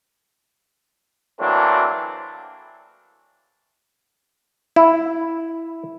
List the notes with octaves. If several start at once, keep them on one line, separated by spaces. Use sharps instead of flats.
E3 F#3 A3 A#3 C4 D4
E4